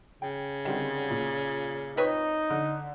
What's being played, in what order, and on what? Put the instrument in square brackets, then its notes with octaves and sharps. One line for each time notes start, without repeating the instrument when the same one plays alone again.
[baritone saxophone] C#3 [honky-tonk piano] G5
[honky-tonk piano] D3 G3 C4 [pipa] D#3
[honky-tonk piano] A#2
[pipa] C4 B4 C#5 [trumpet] D#4
[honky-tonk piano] D3